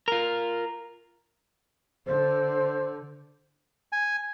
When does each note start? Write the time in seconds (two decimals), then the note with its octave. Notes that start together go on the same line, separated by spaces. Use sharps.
0.08 F4 A#4
2.07 D3 C5
3.92 G#5